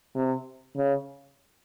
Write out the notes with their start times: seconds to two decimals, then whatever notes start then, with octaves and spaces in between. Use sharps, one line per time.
0.16 C3
0.76 C#3